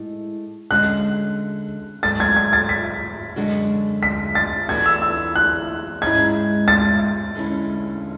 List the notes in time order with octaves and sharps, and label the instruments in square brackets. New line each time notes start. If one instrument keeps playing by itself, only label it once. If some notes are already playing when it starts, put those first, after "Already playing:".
Already playing: [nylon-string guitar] A2 G#3
[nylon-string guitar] D3 G#3 C#4 F#4 [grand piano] F#6
[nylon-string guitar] G#2 F#3 A3 [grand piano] A6
[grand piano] G#6
G#6
A6
B6
[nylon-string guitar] F#2 D3 G#3 D4 F#4
[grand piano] B6
A6
[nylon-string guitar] E3 A3 D4 F#4 [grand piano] G#6
[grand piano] E6
E6
F#6
[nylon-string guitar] G#2 G#3 C#4 E4 [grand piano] G#6
[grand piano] A6
[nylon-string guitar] D3 G#3 C#4 E4